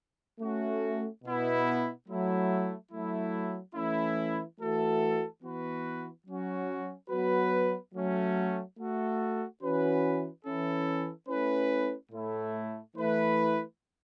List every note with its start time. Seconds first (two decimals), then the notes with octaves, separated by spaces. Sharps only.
0.40 A3 C#4 F#4
1.24 B2 B3 E4
2.08 F#3 A3 E4
2.92 F#3 A3 E4
3.75 E3 A3 C#4 E4
4.59 E3 A3 F#4 A4
5.42 E3 B3 F#4 B4
6.26 F#3 C#4 F#4
7.10 F#3 B3 F#4 B4
7.94 F#3 A3 C#4
8.77 A3 F#4 A4
9.61 E3 C#4 F#4 B4
10.45 E3 C#4 E4 A4
11.28 A3 C#4 E4 B4
12.12 A2 A3 E4
12.96 E3 A3 E4 B4